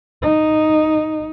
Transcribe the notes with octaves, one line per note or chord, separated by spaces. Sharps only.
D#4